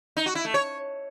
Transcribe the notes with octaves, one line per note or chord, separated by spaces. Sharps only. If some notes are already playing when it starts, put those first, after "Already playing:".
D#4
F#4
E4
A3
C#5